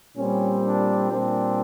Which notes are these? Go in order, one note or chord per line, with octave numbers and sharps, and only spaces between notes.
A#2 G3 C4 C#4
D4
A#2 G3 C4 D4